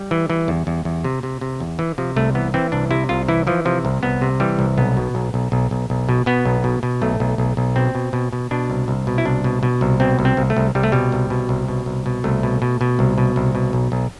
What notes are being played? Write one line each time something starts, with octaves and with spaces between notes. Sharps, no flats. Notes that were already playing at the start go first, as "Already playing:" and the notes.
Already playing: G3
E3
E3
E2
E2
E2
C3
C3
C3
E2
E3
C3 F3
C2 A3
E3 B3
E3 C4
C2 D4
C3 E4
C2 F4
E3 E4
E3 F3
C3 F3
C2
C2 B3
C3
E3 G3
C2
B1 B3
B2
B1
B1
B1
B1
B1
B2
B2 B3
B1
B2
B2
B1 A3
B1
B1
B1
B2 C4
B2
B2
B2
B2 D4
C2
C2
B2
E4
C2 D4
B2
B2
C2
B2 C4
C2
C4
C2
A3
C2
C2 G3
A3
B2 G3
C2
B2
C2
B2
C2
B2
C2 A3
B2
B2
B2
C2
B2
C2
B2
B1
B1